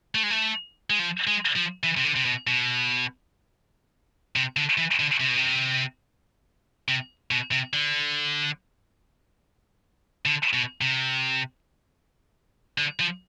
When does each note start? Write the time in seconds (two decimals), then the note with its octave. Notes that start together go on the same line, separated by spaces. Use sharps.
0.15 A3
0.23 G#3
0.30 A3
0.90 G#3
0.99 F3
1.27 G#3
1.56 F3
1.83 E3
1.97 C3
2.05 D3
2.16 C3
2.25 B2
2.47 B2
4.36 C3
4.57 D3
4.78 E3
5.00 D3
5.20 C3
5.29 B2
5.37 C3
6.88 C3
7.31 B2
7.52 C3
7.73 D3
10.26 D3
10.53 B2
10.81 C3
12.78 D3
13.00 F3